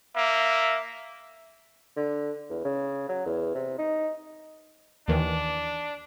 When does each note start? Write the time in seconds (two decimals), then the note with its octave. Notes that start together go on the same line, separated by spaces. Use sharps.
0.16 A#3 E5
1.96 D3
2.50 E2
2.65 C#3
3.09 F#3
3.26 E2
3.55 C3
3.79 D#4
5.08 D#2 D#3 E3 D4